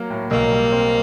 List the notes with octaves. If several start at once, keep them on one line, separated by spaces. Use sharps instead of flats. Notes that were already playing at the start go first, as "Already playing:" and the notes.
Already playing: F#3 A#3
A2
B1 A#3
G3
C4